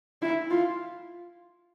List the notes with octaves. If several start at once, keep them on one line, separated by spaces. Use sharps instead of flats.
E4
F4